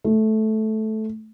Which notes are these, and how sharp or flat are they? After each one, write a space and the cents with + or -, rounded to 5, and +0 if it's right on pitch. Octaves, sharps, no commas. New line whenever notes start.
A3 -10